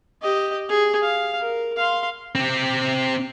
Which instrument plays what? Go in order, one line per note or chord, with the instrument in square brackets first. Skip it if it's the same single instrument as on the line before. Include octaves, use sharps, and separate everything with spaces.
[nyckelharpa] G4 D#5
G#4
F5
A#4
F5 C6
[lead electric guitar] C4 G4